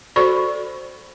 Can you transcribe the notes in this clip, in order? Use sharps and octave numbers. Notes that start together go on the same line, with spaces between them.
F#4 A4 C5 D5 B5 C#6